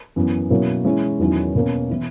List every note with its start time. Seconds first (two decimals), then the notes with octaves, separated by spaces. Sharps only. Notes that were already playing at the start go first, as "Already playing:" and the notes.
0.16 F#2 E3 B3
0.50 B2 F#3 A#3 C#4 E4
0.85 E3 G#3 C#4 E4
1.19 E2 D#3 F#3 C#4 E4
1.55 B2 A#3 C#4
1.90 E3 B3 E4